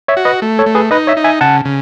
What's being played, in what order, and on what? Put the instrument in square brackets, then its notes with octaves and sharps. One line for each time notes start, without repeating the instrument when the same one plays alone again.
[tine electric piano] C#5 E5
[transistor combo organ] F#4
[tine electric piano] B4 D#5
[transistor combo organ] A3
[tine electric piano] A4 C#5
[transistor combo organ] A3
[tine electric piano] G#4 B4
[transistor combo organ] D#4 [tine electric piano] B4 D#5
[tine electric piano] C#5 E5
[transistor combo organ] D#4
[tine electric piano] E5 G#5
[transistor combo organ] C#3 [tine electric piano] F#5 A5
[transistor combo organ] C#3